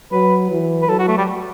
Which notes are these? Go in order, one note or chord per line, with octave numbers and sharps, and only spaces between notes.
F#3 B4
E3
B4
F#3 A4
F#4
A3
G3